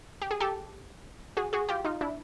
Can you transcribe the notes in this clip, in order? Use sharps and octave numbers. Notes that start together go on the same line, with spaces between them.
G4
G#4
G4 A4
F#4 G#4
F#4 G#4
F4 G4
D#4 F4
D4 E4